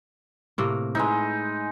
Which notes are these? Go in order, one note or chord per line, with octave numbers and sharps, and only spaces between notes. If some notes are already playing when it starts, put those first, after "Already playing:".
A2 C3 A#3
G#3 D#4 E4 B4